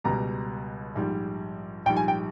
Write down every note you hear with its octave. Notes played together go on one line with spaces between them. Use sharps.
C#2 B2 G3 A#5
A#1 G#2 G3
A#1 G#2 G3 G5
G#5
G5